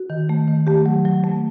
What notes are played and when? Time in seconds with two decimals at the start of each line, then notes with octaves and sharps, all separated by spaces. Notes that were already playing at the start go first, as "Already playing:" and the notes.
Already playing: F#4
0.10 D#3
0.29 A3
0.48 D#3
0.67 A3 G4
0.86 F#3
1.05 F#3
1.24 A3